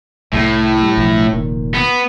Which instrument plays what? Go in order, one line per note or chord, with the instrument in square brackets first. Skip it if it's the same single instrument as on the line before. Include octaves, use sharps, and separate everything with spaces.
[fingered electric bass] C2 G3 A3 [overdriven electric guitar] A2
[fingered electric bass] G3
B1 G2 F3
F1 A#2 D#3
[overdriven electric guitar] B3